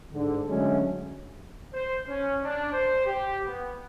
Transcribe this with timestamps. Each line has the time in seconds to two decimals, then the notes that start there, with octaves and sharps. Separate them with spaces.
0.13 G#2 D3
0.48 D3 F#3 G#3 A3 C#4
1.73 C5
2.08 C#4
2.43 D4
2.73 C5
3.05 G4
3.46 B3